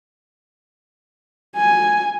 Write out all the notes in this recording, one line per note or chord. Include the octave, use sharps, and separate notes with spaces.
G#5